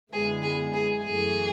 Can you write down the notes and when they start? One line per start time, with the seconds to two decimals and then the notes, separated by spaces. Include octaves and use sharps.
0.12 F#2 D3 G#3 B3 E4 G#4
0.42 G#4
0.74 G#4
1.04 F#2 E3 A3 G#4